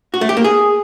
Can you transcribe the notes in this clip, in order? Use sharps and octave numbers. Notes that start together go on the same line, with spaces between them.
F#4
A3
G4
A#3
G#4